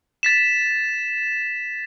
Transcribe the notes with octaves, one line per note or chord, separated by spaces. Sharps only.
A6 B6 E7